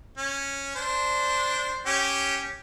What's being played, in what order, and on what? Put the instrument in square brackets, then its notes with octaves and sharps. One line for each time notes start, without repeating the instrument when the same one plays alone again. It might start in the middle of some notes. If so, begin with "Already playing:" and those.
[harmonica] C#4
D4 C5
C#4 G4